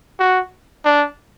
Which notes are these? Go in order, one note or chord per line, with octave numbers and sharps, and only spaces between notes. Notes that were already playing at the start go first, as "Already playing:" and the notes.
F#4
D4